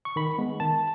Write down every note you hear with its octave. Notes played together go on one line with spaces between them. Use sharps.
C#6
D#3 B5
G#3 B3
D#3 A5